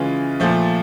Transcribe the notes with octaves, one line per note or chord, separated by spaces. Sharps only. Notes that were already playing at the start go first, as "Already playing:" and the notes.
Already playing: C#3 E3 G#3 C#4 F4
A#2 F3 A3